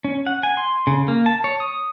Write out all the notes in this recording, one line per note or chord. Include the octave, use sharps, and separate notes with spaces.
C#4
F#5
G#5
C6
C#3
A#3
A5
C#5
D#6